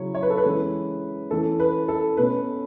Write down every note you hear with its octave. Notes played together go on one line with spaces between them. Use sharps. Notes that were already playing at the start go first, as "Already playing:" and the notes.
Already playing: C#3 F#3 C#4 E4 C#5
C#5
B4
A4
B4
E3 G#3 C#4 E4
E3 A3 C#4 A4
B4
A4
B2 A3 C#4 B4